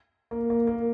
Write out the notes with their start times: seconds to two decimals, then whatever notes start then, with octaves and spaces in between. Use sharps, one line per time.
0.31 A#3
0.50 A#3
0.67 A#3